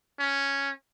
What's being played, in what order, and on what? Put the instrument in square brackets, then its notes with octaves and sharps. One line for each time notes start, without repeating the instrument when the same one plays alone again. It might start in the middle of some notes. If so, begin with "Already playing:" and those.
[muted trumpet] C#4